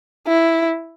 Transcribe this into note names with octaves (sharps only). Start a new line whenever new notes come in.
E4